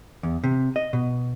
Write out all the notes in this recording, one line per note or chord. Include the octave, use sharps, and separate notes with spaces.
E2
C3
D#5
B2